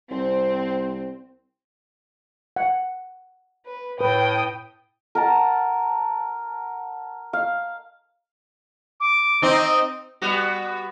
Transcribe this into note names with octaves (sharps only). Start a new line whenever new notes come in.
C2 C4
F#5
B4
A2 B4 G5 D#6
A#4 F#5 A5
F5
D6
C4 D#4
G3 B3 F#4